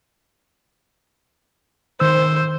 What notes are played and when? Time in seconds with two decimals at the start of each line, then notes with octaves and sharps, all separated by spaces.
2.00 D#3 C5 E6